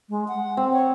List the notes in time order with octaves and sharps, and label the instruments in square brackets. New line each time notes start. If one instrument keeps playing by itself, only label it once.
[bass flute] G#3
F#5
[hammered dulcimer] C4
[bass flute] C#5